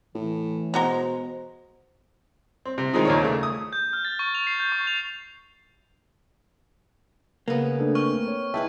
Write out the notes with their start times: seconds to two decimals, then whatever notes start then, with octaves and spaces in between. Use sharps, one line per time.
0.15 A2 E3
0.74 B2 G#3 F#4 C5 A#5
2.65 C4
2.78 C3
2.94 D#3 F3 G#3 C4 D#4
3.05 D#2 A#2 C#5
3.22 C#3 A3
3.43 D#6
3.73 G6
3.93 F6
4.05 A6
4.19 C#6
4.35 F7
4.47 C7
4.60 G6
4.72 C#6
4.87 F7
7.48 C#3 A#3 B3
7.79 A3 D4 A4
7.95 C4 C#6 F6
8.28 C#5
8.54 G#3 E4 B4 E5 G5 A5